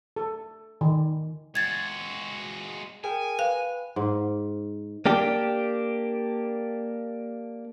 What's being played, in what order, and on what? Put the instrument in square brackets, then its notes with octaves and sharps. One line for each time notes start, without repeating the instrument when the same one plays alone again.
[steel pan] A4
D#3
[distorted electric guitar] G#3 F#4 [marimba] G#6 A6
[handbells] G#4 A#4 G5 [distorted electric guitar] G#5
[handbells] B4 [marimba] F5
[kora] G#2
[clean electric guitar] A#3 D4 G4